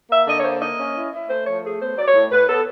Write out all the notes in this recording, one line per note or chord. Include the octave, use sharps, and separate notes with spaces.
A#3 E5
D3 D#5
C#5
A#3 C5
A#3 D#5
C#4
E4
E4
A3 C5
F3 C#5
A3 G#4
B3 C5
F#3 D5
C#5
A2
A2 B4
B3 A4